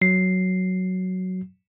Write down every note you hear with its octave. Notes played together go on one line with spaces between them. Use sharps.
F#3 C7